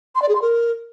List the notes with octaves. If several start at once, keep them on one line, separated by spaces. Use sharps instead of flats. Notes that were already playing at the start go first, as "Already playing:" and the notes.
C6
D5
G#4
C6
A#4